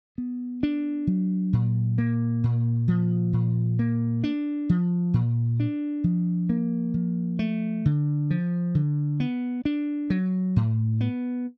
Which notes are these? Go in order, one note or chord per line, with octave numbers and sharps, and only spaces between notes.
B3
D4
F#3
A#2
A#3
A#2
F3
A#2
A#3
D4
F3
A#2
D4
F3
A#3
F3
A3
D3
F3
D3
B3
D4
F#3
A2
B3